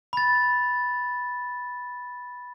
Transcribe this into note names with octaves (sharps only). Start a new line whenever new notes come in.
B5 A6